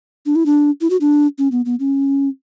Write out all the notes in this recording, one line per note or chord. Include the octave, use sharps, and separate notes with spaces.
D4
E4
D4
E4
F#4
D4
C#4
B3
B3
C#4